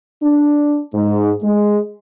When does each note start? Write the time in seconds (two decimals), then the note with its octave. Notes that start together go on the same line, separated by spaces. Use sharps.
0.22 D4
0.94 G#2
1.43 G#3